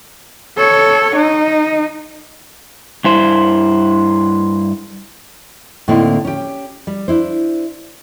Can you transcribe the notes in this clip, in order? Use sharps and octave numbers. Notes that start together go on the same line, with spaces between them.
A4 C#5
D#4
G2 E4 C5
A2 D3 A#3 C4 D#4 E4
C#4 G4
G3
D4 E4 C5